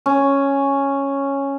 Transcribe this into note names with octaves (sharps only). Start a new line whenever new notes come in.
C#4